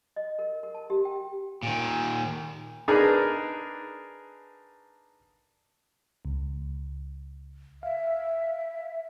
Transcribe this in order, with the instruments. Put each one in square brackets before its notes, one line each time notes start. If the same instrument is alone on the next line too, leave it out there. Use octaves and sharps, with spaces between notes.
[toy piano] D#5
A#4
A#4
A5
G4
G5
[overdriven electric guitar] A#2 D#3
[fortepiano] D4 D#4 G#4 A#4 B4
[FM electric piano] C#2
[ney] E5 [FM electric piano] F5